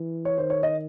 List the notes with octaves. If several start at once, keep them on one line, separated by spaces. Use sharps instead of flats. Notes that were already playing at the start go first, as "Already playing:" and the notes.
Already playing: E3
C#5
D#3 C5
C#5
D#5